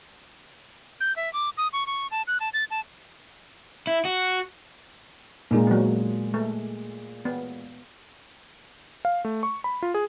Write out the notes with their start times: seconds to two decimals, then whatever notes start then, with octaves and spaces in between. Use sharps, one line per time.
1.00 G6
1.16 E5
1.33 D6
1.57 D#6
1.73 C#6
1.87 C#6
2.11 A5
2.27 F#6
2.40 A5
2.53 A6
2.70 A5
3.87 E4
4.05 F#4
5.51 A#2 G#3 A#3 D#4
5.67 F#3 B3
6.34 A3
7.25 B3
9.05 F5
9.25 A3
9.43 C#6
9.64 B5
9.82 F4
9.94 G#4